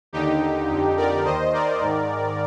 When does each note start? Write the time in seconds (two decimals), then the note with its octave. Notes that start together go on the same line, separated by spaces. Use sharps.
0.13 D#2 D3 D#4 G4
0.70 F2 D3
0.97 A#4 D5
1.25 D#2 D#3 C5 D#5
1.53 A#4 D5
1.81 G#2 D#3